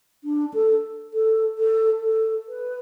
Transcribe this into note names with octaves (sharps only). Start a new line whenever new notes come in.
D4
A4
A4
A4
A4
B4